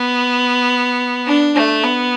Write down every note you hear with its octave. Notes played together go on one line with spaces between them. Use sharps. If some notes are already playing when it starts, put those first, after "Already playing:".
Already playing: B3
D4
A3
B3